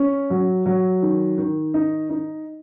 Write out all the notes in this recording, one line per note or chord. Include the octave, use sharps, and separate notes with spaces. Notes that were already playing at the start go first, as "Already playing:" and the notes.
Already playing: C#4
F#3
F#3
D#3
D#3
D#4
D#4